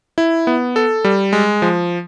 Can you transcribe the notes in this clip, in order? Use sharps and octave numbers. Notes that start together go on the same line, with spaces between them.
E4
B3
A4
G3
G#3
F3